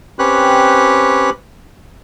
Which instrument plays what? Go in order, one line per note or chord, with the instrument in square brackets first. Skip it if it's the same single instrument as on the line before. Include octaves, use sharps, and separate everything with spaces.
[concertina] C4 C#4 G4 B4 C#5 F#6